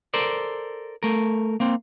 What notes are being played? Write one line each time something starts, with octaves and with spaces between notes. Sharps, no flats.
A4 A#4 C5 D5
A3 A#4
A#3 C4